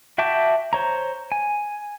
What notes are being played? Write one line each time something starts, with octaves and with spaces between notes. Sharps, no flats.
F#4 E5 G5 A5 D6
C5 C#5 A#5
G#5